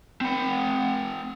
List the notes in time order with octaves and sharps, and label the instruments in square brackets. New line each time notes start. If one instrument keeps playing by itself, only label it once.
[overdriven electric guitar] C4 F#5